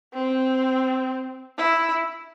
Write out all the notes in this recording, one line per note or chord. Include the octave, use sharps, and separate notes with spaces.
C4
E4